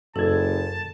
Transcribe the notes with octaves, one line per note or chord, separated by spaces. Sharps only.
F#1 F#2 A4 A5 G#6